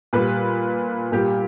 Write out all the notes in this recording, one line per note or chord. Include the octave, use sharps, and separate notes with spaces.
A#2 G3 B4
A#2 G3 G4